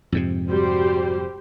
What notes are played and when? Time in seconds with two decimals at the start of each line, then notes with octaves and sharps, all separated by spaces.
0.12 F2 G#2 C3
0.49 G3 F#4 G4 C5